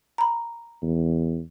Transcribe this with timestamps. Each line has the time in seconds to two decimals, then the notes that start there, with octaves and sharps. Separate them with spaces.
0.18 A#5 B5
0.82 E2